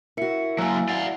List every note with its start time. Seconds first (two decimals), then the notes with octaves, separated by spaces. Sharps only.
0.17 E4 F#4 A#4 E5 C#7
0.58 F#3 A#3 G#5 E6
0.89 D5 F5 F#5